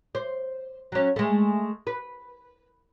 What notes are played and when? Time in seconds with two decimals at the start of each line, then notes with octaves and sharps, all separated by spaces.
0.15 C5
0.92 F#3 C#4
1.16 G#3 A3
1.87 B4